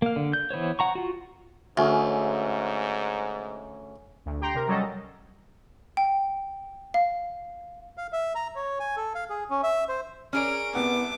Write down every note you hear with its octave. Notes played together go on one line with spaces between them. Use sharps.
A#3 F5
D3
G6
E3 B3 C5 C#5
F#5 A#5 C#6
F4 F#4
D2 G#2 C#4 G#4 E5
D2
G4 G5 A#5 C6
C3 A#4
F#3 G3 C#4 A4 D#5
G5
F5
F5
E5
A#5
C#5
G#5
A4
F5
G#4
C#4
E5
C5
C#4 G#4 A#4 D5 D7
C2 C3 B3 F#5 D6